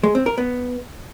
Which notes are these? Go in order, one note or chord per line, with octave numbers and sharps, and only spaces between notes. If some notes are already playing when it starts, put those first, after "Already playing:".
G#3
C4
A#4
B3